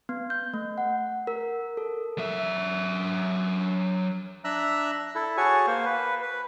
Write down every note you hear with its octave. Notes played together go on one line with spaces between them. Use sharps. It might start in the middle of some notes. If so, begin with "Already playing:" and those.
B3
G6
A3
F#5
A#4
A4
F#3 E5
D4 E5 A#5 E6 F#6
E4 A4
F#4 G#4 C#5 G#5 A5 C#6
A#3 C5 F5
B4
B4